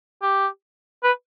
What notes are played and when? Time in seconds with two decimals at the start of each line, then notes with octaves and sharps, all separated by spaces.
0.22 G4
1.03 B4